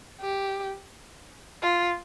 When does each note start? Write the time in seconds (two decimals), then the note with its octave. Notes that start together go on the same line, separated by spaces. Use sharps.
0.21 G4
1.63 F4